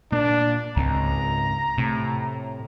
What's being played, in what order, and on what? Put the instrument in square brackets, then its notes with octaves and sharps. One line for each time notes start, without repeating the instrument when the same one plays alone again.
[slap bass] A#2 A#3 [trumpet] D4
[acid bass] C#2 [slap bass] G#2 C4 [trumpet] A#5
[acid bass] A2 [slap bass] C3